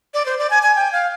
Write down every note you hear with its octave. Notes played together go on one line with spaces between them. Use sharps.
D5
C5
D5
G#5
G#5
G5
F5